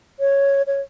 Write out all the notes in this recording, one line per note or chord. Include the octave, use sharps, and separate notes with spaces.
C#5
C#5